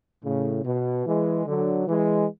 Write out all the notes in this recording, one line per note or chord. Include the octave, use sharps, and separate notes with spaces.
A2 C#3
B2
E3 G#3
D3 F#3
E3 G#3